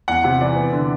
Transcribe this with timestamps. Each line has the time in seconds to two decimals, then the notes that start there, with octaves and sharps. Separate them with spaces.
0.08 E2 F#5
0.24 C3 F#5
0.41 E3 D5
0.56 B3
0.73 D3